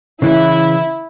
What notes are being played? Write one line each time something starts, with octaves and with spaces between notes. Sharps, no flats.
C#3 E3 E4